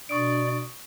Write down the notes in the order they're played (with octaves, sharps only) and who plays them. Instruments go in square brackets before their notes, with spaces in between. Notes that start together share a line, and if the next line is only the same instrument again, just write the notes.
[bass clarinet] B2 [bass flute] D4 [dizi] D5 [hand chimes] C#6 D#6 D7